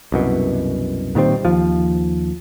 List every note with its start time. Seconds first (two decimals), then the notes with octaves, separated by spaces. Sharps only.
0.12 C2 F#2 B2
1.15 A#2 D#3 G3 C4
1.45 D#2 F3